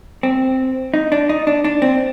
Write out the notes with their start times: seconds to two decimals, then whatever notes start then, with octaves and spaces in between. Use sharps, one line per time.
0.23 C4
0.94 D#4
1.12 D4
1.29 D#4
1.47 D4
1.64 D4
1.82 C4